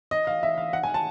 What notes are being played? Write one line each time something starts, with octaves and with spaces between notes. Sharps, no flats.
D#5
F5
E5
F5
F#5
G#5
A5